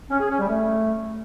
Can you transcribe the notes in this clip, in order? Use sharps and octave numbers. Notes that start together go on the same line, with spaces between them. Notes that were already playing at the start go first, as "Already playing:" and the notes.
C#4
G#4
C#4
G3
A3